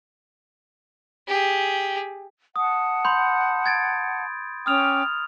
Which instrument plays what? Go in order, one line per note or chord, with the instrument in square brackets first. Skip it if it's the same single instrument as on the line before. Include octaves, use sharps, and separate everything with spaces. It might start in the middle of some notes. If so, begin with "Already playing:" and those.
[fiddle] G4 G#4
[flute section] F#5 A5 [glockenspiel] D#6
[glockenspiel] B5 C6 G6
G#6 A6 D7
[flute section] C#4 G5 D6 [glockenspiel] D#6 F6 F7